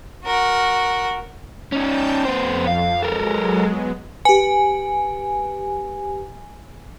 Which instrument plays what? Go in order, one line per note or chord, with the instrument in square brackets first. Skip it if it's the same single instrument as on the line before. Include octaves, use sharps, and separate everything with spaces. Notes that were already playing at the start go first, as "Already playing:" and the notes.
[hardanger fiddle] F#4 A#4
[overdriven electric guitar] C#4 D#4 [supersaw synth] G5 A5 G6
[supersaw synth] F2 [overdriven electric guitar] B3 C5
[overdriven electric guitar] F5
[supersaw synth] F#3 G#3 [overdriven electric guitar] A4 A#4
[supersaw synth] B3
[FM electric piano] G4 B4 [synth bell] G#5